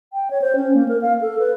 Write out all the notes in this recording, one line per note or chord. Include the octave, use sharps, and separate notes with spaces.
G5
C#5
C5
C#4
A#3
A#4
F5
A4
B4